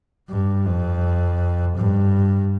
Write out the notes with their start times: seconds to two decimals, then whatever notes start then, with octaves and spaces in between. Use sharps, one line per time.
0.29 G2
0.65 F2
1.76 G2